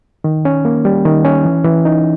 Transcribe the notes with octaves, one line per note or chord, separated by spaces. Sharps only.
D#3
C#4
A#3
G3
D#3
C#4
E3
E3
D#4